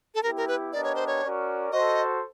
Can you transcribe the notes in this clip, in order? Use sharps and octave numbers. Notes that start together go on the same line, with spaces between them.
A4
B3 E4 G4 A#4
A#4
B4
B3 D4 G4 A#4 D5 D#5
C#5
C5
C#5
C#4 F#4 A#4 D5
F#4 A4 C5 D#5